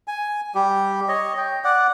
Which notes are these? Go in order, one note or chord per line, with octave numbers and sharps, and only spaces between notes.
G#5
G3 G4
C#5 D#5
G5
D5 F#5